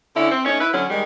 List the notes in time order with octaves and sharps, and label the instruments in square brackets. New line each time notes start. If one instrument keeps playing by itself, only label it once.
[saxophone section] D3 C#4 D4 E4
C4
A3 C#4 D#4 C#5
E4 B4
D3 F#3 C#4
D#3 G3 G#3